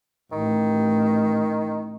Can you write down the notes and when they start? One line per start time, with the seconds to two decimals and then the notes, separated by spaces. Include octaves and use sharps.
0.32 A1 D#3